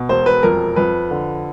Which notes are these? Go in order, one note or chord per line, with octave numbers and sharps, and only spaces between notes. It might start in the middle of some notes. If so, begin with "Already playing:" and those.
Already playing: B2
E1 C5
B4
F2 A#4
F2 B4
D3